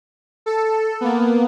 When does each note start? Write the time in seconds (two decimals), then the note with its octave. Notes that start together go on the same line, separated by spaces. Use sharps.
0.46 A4
1.01 A#3 B3